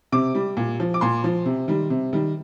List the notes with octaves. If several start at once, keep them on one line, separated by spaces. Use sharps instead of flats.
C3 D6
G3
A#2
F3
D6
A#2 C6
F3
C3
D#3 G3
C3
D#3 G3